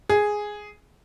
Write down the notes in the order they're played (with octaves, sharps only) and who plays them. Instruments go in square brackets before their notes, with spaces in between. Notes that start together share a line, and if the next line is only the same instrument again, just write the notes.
[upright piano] G#4